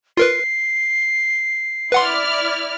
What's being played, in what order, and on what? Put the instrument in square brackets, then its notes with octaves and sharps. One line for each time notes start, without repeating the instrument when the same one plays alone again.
[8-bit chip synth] F4 A#4 B4 [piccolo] C7
[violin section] E4 D5 F6 [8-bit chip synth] B4 F#5 C6